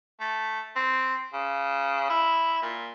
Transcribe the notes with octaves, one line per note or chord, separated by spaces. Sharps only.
A3
C4
C#3
E4
A#2